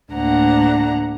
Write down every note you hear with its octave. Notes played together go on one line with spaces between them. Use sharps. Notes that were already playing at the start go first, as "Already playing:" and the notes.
D2 A2 A#3 D4 F#5 A#5